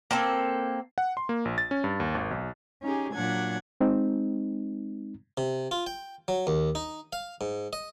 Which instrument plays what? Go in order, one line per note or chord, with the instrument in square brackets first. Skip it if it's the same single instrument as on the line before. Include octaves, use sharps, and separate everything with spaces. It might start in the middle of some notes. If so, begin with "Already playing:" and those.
[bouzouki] A#3 C4 A4
[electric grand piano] F#5
C6
A#3
A#1
A6
C#4
G2
D#2
G#1
B1
[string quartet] C#4 D#4 G4 G#4
A#2 F#3 D4 F#5 G#6
[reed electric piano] G#3 C4 D#4
[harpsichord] C3
F4
G5
F#3
D#2
D#4
F5
G#2
D#5